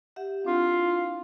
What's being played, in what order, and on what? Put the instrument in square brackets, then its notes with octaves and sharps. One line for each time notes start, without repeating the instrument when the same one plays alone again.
[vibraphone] G4 E5 F#5
[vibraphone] C4 D4 E4 [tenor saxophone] F4